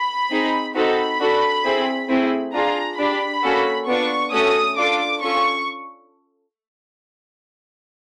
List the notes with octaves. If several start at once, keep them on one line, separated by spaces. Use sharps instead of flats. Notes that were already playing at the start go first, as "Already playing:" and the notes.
Already playing: B5
C4 D#4 G#4
C4 D#4 F#4 A4 B5
D4 F#4 A4
C4 E4 G#4
A3 C4 E4 G#4
D4 F4 G#4 A#5
D4 G4 B5
A#3 C#4 F#4 A4
B3 D4 F4 C#6
A3 C#4 F#4 A4 D#6
D4 F4 A4 D6
C#4 F4 A4 C#6